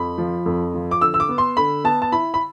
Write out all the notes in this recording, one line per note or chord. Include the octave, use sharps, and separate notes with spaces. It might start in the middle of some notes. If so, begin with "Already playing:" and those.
Already playing: F2 B5
F3
F2
F3
D6
D3 E6
E6
D6
B3
C6
D3 B5
B3 A5
A5
E4 B5
B5